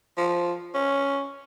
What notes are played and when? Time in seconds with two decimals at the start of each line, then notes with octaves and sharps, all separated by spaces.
0.18 F3
0.74 C#4